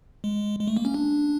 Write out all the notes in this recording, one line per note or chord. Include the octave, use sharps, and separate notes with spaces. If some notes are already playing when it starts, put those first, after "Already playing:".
G#3
G#3
A3
A#3
C#4
D4